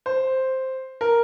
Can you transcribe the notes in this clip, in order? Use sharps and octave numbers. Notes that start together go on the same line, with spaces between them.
C5
A#4